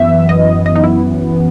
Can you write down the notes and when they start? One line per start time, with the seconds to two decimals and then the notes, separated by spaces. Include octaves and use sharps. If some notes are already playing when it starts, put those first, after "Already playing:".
Already playing: F#2 E3 B3 E5
0.29 D#5
0.66 D#5
0.76 D#4
0.84 E4